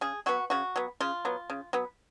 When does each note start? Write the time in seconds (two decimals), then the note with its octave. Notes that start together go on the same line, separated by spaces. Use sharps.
0.01 C#3 G#4
0.26 F#3 B3 F#4
0.50 C#3 F#4
0.76 F#3 B3
1.00 C#3 F4
1.25 F#3 B3
1.50 C#3
1.73 F#3 B3